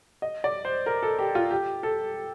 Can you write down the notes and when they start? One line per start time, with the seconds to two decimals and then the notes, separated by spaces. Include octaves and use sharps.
0.22 D#5
0.44 D5
0.65 C5
0.86 A#4
1.03 A4
1.19 G4
1.35 F4
1.51 G4
1.83 A4